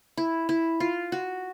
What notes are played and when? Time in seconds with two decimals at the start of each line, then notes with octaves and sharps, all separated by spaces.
0.17 E4
0.49 E4
0.80 F4
1.12 F#4